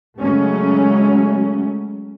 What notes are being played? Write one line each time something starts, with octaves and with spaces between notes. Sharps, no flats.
C#3 F#3 G#3 A3 C#4